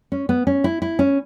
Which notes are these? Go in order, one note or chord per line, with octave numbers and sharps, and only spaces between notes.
C#4
B3
C#4
E4
E4
C#4